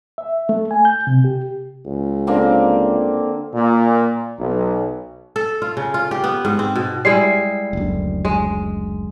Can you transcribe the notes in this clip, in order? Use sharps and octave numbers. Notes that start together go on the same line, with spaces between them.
E5
A3
G#5
G6
C3
G4
C#2
D3 A#3 C4
A#2
B1
A4
F4
C#3
F4
G4
B3
G#2
C4
B2
G3 G#3 E4 C7
F#1 D2
G#3